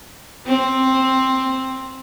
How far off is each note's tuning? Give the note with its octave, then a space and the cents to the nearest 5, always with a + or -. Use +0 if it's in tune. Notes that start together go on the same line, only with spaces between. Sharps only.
C4 +10